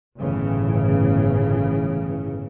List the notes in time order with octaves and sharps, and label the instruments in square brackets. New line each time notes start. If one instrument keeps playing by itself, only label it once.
[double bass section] G1 A2 C#3 E3